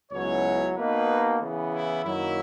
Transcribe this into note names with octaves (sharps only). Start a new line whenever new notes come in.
C#2 B2 F#3 C#4 E4 C#5
B2 A#3 D#4 B4
C#3 E3 B3
E4
F#2 D#3 F#3 A#3 E4